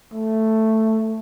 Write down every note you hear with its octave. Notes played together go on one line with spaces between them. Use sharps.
A3